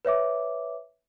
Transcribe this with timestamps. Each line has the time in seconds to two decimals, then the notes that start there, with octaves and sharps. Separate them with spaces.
0.05 B4 C#5 E5 D6